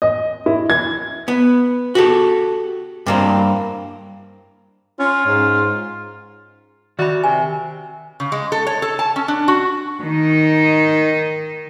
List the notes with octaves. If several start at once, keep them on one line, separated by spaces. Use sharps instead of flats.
D#5
E4
G#6
B3
F#4 G4 A4
G2 A#3 C4
C#4 F4
G#2
D#3 F#4 D5 E5 B5
C3 G#5
C#3
G#3
A4
C#5
A4
A5
C#4
D4
F#4
D#3 D#4